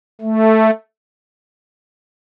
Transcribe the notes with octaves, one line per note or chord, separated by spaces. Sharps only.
A3